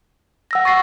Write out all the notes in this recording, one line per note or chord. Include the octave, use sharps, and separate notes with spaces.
F#5 E6 A#6
C#6 A6 C7